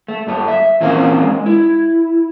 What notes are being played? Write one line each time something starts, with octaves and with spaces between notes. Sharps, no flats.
A3
G2 A4
E5
A#2 E3 C4 C#4 A#4 F5
G#3
E4